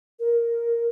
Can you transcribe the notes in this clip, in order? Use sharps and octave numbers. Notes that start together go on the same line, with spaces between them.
A#4